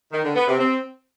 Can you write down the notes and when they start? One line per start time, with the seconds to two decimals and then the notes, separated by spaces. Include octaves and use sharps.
0.11 D#3
0.23 D3
0.35 B3
0.47 C3
0.59 C4